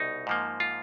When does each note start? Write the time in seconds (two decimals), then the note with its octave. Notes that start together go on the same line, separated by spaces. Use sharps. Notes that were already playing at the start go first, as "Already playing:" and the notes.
Already playing: C2 B2 D#4
0.27 G#2 F3 A#3
0.60 F4